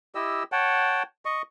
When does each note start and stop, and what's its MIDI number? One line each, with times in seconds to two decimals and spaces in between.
0.15 0.43 64
0.15 0.43 67
0.15 0.43 75
0.15 0.43 88
0.52 1.03 73
0.52 1.03 78
0.52 1.03 79
0.52 1.03 81
1.25 1.42 75
1.25 1.42 85